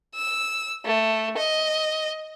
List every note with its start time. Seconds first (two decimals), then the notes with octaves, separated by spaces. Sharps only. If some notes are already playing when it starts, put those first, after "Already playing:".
0.15 E6
0.85 A3
1.37 D#5